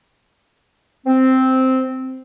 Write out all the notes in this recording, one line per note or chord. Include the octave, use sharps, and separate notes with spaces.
C4